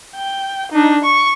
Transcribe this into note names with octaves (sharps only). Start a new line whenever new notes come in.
G5
D4 D#4
C#6